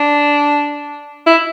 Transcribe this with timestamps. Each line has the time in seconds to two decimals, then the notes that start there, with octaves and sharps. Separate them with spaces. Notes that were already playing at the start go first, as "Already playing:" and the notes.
Already playing: D4
1.27 E4